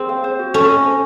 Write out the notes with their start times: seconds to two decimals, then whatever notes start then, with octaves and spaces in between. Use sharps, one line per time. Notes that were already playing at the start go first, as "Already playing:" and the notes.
Already playing: C4 G#4
0.09 F5
0.24 C5
0.39 F#4
0.54 C#4 A4
0.69 D#5
0.85 C5